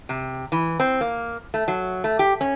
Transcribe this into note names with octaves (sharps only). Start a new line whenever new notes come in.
C3
E3
C4
A#3
A3
F#3
A3
G4
C#4